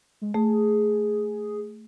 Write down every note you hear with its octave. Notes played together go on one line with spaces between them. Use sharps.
G#3
A3 G#4